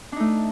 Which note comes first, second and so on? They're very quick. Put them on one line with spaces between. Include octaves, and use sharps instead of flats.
D4 D#4 A3